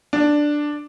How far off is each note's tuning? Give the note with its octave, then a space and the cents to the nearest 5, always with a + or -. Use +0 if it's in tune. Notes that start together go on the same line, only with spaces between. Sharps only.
D4 +5